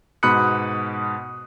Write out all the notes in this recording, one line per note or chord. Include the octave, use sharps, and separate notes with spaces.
G#2 B2 B5 D#6 F#6 C#7